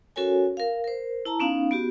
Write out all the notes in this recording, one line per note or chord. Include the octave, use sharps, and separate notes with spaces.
C#4 F#4 A4 A#4 C#5 G#5
A#4 F5
A#4 C5
E4 A5 A#5
B3 C#4 D#4 F5
B3 F#4 G4